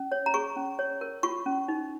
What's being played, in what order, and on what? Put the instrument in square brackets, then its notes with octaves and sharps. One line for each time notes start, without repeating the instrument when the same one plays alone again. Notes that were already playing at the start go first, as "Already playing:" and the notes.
Already playing: [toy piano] C#4
C#5
A#5
G#4 C#6
C#4
C#5
A#4
F4 C#6
C#4
D#4